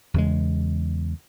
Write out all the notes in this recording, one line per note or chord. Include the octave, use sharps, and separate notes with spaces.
E2 C#3 G#3